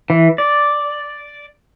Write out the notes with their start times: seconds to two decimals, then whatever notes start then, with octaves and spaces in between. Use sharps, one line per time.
0.10 E3
0.38 D5